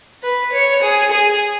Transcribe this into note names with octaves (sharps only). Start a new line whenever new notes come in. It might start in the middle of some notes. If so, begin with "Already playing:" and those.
B4
C#5
G#4
G#4